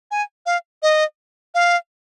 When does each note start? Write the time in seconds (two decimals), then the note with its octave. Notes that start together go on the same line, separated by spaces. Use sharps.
0.11 G#5
0.46 F5
0.83 D#5
1.55 F5